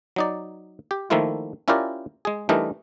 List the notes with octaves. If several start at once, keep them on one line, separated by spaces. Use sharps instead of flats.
F#3 D#4 D5
G4
D#3 F3 A3 A#3 E4 F4
C#4 E4 F4 G4 A#4 D5
G#3 G#4
E3 G3 A3 D4 D#4 A#4